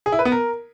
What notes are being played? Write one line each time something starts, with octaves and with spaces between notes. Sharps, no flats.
G#4
E4
B4
B3
A#4